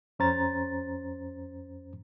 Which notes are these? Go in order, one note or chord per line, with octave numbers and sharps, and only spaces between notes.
F2 C#4 C5 A#5 A6